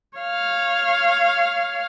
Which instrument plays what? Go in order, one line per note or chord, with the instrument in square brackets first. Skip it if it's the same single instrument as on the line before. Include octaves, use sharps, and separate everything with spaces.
[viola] C#5 F5